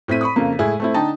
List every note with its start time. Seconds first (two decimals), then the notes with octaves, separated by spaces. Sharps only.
0.08 A2 C4 E4 B6 D#7
0.21 B5 C#6 D#6
0.36 F2 C#3 A#3
0.59 A2 G#3 E4 G#5
0.80 A3 C4 E4
0.94 D3 D#4 G5 A5